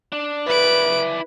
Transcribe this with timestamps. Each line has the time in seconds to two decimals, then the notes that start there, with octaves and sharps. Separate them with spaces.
0.12 D4
0.47 E4 B4 D5 D7